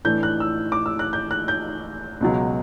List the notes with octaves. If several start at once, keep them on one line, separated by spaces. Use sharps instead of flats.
A2 E3 A3 D4 G6
F#6
E6
D6
E6
F#6
G6
F#6
G6
C#2 B2 F#3